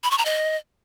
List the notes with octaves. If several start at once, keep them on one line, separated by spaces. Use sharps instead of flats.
B5
C#6
A#5
D#5